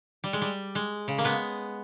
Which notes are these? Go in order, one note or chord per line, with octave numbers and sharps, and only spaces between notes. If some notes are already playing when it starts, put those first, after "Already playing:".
G3
G#3
G3
G#3
C#3
A#3
G#3 B3